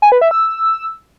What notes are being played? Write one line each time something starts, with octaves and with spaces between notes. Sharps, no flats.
G#5
B4
E5
E6